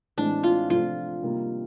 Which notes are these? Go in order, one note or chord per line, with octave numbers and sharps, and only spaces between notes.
A2 E3 G#3 C4 D4
F4
C3 F3 A3 C4 F4
C3 D#3 G3 A#3